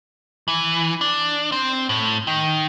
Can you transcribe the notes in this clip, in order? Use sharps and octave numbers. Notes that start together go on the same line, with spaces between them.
E3
D4
C4
A2
D#3